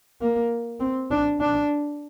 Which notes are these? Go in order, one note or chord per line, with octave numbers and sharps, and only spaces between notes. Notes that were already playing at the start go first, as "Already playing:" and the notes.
A#3
C4
D4
D4